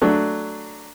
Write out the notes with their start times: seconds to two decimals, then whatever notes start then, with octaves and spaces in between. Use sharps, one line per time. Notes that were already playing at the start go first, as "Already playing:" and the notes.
0.02 F#3 A3 D4